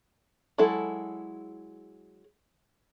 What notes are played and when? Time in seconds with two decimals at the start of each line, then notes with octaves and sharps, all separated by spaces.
0.58 F#3 G#3 E4 A4